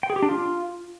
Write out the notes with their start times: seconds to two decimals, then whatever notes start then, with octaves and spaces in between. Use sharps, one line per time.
0.03 G5
0.10 G#4
0.16 G4
0.22 D4
0.29 F4